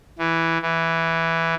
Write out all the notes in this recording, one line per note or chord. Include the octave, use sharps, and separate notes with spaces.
E3
E3